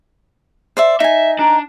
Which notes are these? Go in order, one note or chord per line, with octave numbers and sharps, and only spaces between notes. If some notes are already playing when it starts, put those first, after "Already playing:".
C5 D5 E5
D#4 E5 G#5
D4 A#5